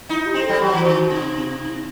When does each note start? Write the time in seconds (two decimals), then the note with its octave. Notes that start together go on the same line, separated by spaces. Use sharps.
0.09 D#4 E4
0.26 G4
0.34 C4
0.43 A4
0.49 G3
0.59 F#3 G4
0.73 E3 F#4
0.84 D#3
0.93 F#4
1.09 C3 D#4
1.34 C4
1.60 D#4
1.69 E4